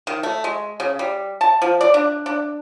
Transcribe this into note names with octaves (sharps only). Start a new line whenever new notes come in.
D#3
A3
G#3
C#3
G3
A5
F3
D5
D4
D4